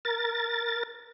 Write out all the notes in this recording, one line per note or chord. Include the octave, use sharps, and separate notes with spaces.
A#4 A6